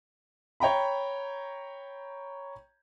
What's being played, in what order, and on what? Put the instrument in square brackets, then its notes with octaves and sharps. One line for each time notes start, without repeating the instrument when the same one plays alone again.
[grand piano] C#5 G5 A#5 B5